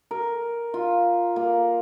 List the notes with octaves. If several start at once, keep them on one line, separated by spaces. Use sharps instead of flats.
A#4
F4
A#3